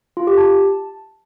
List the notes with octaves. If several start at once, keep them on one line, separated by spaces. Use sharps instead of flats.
F4
G4
A5